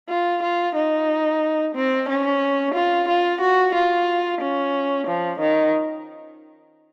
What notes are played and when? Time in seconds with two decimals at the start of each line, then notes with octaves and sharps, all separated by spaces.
0.09 F4
0.42 F4
0.75 D#4
1.75 C4
2.09 C#4
2.74 F4
3.08 F4
3.41 F#4
3.74 F4
4.41 C#4
5.07 F3
5.40 D#3